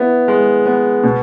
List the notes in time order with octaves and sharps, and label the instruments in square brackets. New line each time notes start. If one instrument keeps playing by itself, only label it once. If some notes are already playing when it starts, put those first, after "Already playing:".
Already playing: [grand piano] B3 E4
G#3
B3
B2